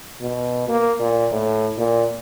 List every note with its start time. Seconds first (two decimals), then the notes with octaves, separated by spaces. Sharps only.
0.21 B2
0.68 A#3
1.00 A#2
1.32 A2
1.77 A#2